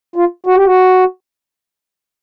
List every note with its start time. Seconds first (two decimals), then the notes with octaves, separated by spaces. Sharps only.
0.16 F4
0.46 F#4
0.55 G4
0.65 F#4